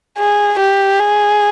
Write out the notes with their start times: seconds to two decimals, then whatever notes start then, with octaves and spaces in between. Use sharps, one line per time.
0.19 G#4
0.60 G4
1.00 G#4